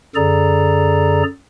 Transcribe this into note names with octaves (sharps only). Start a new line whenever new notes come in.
F#2 D3 G#4 A4 D5 A#5